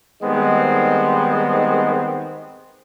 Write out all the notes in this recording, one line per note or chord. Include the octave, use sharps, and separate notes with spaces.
D#3 G3 G#3 B3 C4